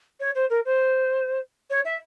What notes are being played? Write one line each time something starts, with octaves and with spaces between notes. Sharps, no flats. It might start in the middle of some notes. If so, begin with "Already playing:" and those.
C#5
C5
A#4
C5
C#5
E5